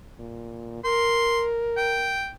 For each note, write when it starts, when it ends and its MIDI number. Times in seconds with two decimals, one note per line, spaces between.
0.19 0.83 46
0.84 2.22 70
0.84 1.43 84
1.77 2.31 79